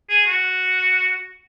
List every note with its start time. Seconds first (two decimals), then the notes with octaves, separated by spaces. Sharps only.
0.10 G#4
0.27 F#4